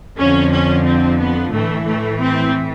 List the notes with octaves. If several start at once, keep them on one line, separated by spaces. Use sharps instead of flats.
F2 D3 F3 C#4
C#4
C4
B3
A2 E3 A3
A3
C4